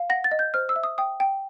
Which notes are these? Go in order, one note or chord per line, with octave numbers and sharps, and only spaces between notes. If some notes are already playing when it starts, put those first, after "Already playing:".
Already playing: F5
F#5 A#6
A6
D#5
G6
C5 F6
E6
E5
D#6
G5 D#6
G5